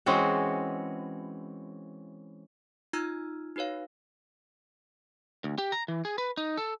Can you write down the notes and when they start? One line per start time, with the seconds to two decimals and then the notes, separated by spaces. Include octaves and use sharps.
0.06 E3 G#3 C4 C#4 F#4
2.93 D#4 F4 A#5 E6 F6 G#6
3.56 D#4 F#4 B4 C#5 F5
5.44 D2
5.58 G4
5.72 A#5
5.88 E3
6.05 G#4
6.18 B4
6.37 D#4
6.57 A4